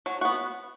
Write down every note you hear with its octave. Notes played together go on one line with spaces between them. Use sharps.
F#3
B3 F#4